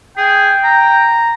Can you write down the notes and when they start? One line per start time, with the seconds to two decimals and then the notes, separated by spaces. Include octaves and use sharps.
0.18 G#4 G5
0.64 A#5